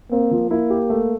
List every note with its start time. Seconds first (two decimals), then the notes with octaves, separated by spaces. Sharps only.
0.11 A#3 C4
0.31 F3
0.51 A#3 E4
0.70 G4
0.90 A3